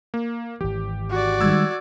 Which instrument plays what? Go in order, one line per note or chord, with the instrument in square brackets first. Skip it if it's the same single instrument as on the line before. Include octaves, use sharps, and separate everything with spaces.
[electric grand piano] A#3
[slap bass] G#1 E3 [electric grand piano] G4
[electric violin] F#4 D5
[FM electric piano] D#3 G3 G#3 [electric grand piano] E6 G#6